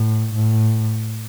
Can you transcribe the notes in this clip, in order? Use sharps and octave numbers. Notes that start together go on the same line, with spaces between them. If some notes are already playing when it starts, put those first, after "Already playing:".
Already playing: A2
A2